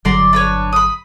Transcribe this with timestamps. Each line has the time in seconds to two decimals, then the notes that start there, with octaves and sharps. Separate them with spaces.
0.05 G1 D3 F#3 D5 A#5 C6
0.33 D4 B4 C#5
0.73 B5 D#6